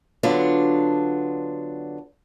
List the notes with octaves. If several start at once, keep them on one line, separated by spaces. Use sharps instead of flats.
D3 F#3 B3 D4 F4